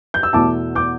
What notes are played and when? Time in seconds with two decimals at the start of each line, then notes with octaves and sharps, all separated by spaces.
0.14 G6
0.23 E6
0.33 E2 B2 A3 E4 A5 D6
0.75 D6 G6